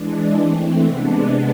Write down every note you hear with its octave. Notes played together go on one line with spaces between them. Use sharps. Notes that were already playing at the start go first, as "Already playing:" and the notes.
Already playing: E3 G#3 D4
E3 A3 C4
C3 G#3 B3 D4